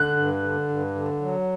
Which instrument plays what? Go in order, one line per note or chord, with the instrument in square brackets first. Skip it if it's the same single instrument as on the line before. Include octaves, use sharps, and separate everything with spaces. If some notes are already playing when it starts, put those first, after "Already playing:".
Already playing: [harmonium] D3 [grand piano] F#6
[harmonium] G2
D3
G2
D3
F#3